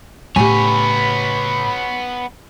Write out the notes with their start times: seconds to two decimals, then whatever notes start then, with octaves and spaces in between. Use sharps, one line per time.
0.36 A2 C#3 B3 G4 C#5 G#5 B5